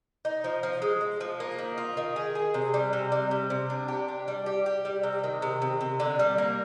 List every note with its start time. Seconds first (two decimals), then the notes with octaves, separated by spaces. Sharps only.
0.25 D#4
0.44 F3
0.63 F3
0.82 G#3
1.01 G#3
1.20 F3
1.40 A#3
1.58 D#3
1.78 F4
1.97 D#3
2.16 G#4
2.35 G#4
2.54 C3
2.74 G3
2.93 C3
3.12 G3
3.31 C3
3.50 C3
3.70 D4
3.88 G4
4.08 D4
4.28 G3
4.46 G4
4.66 G4
4.85 G3
5.03 C3
5.24 D#3
5.42 C3
5.62 C3
5.81 C3
6.00 D3
6.19 G3
6.38 A#3